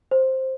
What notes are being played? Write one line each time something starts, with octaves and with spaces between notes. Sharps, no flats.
C5